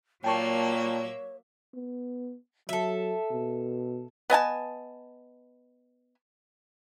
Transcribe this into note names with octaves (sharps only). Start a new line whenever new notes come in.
A#2 F#3 A#3 C#5 E5 G5 A5 C#6
B3
F#3 A4 E5
B2
B3 D#5 G#5 A5